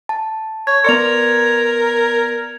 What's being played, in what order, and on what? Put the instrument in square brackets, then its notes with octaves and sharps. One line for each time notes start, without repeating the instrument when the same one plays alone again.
[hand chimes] A5
[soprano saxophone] C#5 [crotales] G#6
[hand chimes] B3 D5 C6 [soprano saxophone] A#4 [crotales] C#7 F7